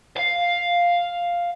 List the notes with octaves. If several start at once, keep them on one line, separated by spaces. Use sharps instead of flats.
F5